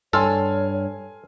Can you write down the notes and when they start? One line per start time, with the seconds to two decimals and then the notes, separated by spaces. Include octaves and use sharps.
0.13 G2 A4 C#5 G#5 C6 F6